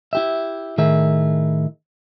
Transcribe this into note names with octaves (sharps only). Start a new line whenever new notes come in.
E4 G4 E5
A2 D#3 G#4 A#4 E5